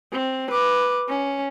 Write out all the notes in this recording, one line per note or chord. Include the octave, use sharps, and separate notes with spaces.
C4
B4 D6
C#4